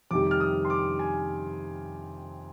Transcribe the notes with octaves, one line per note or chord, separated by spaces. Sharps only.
F2 C3 D#3 G3 D6
F6
D#6
C6
D6
G#5